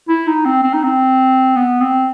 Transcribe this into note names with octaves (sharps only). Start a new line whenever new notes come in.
E4
D#4
C4
C4
D#4
C4
B3
C4